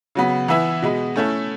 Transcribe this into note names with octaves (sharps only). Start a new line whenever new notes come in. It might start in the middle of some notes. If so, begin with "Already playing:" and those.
C#3 F#3 B3
E3 B3 E4 B4 E5
B2 G#3 B3
A3 C#4 E4 A4